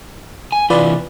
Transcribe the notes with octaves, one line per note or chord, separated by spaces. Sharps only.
G#5
C3 E3 F4 B4 D5